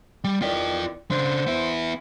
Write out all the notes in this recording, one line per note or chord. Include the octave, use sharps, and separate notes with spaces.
G3
E2 D#3 F4 D5 G5
C#3 D4 C5
B3 E4